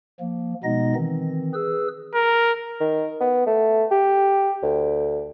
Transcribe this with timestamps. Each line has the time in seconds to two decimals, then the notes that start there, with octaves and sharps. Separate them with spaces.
0.20 F3 A#3
0.64 B2 G#3 B3 D#4 D#5 A#6
0.95 D#3 E3 C4
1.54 G#4 B4 E6
2.14 A#4
2.80 D#3
3.20 B3
3.46 A3
3.91 G4
4.62 D2